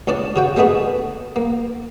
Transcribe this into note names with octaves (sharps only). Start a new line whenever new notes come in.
C#2 C#4 D4 D5
C#3 F#4 G5
G#3 A3 B3 D4 G#4
A#3